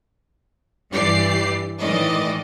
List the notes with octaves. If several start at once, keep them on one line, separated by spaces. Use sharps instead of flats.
G2 E3 G4 D5 C7
A2 D#3 E3 D5 D#5